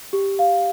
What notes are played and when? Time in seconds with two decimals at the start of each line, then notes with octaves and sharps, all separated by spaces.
0.13 G4
0.39 F5